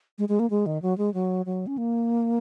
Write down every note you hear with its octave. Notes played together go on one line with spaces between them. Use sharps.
G#3
G#3
A#3
G#3
D#3
F#3
G#3
F#3
F#3
C#4
A#3